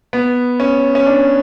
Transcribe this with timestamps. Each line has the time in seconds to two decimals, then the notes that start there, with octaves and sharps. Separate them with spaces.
0.13 B3
0.60 C#4
0.95 C#4
1.06 D4